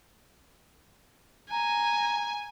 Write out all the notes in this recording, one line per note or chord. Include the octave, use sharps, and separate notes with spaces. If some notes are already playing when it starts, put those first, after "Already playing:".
G#5 A#5